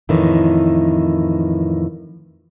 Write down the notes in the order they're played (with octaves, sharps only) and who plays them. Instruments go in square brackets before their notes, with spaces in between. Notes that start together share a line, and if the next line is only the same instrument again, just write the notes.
[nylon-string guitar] F2 A2 D#3 E3